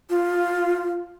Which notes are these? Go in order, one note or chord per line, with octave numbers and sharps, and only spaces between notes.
F4